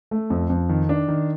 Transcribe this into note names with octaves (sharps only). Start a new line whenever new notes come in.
A3
F2
F2
D#3
D4
D#3